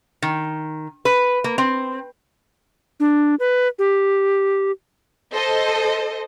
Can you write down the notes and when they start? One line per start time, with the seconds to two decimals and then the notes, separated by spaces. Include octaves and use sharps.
0.22 D#3
1.05 B4
1.44 A#3
1.58 C4
3.00 D4
3.40 B4
3.79 G4
5.34 A4 C5 D#5